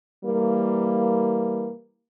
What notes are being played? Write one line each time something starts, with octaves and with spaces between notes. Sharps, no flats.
E3 G3 A#3